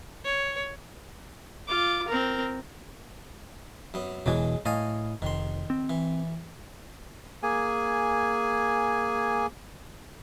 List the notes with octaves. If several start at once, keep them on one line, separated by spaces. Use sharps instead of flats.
C#5
F4 D6
C4 A#4
F#2 B3
E1 B2 E3 F#3 G#3
A2 D#5 F5 G#5
F1 D#3 C6
C4
E3
A#3 G#4 G#5